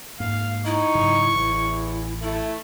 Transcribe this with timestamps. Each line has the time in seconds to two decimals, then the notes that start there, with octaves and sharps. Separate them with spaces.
0.20 G#2 A#3 F5
0.65 D#4 E4 C#6
0.95 G#2 C#3 F#3
1.32 A1 E2
2.22 A3 E4 A4